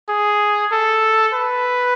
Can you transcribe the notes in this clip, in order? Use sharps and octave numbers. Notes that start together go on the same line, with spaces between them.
G#4
A4
B4